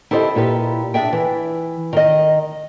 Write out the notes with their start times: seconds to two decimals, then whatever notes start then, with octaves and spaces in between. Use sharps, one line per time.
0.11 E4 G4 A4 C5 C#5 D#5
0.35 A#2 E4 G4 B4
0.94 D4 G#4 E5 G5
1.13 E3
1.93 D#3 D#5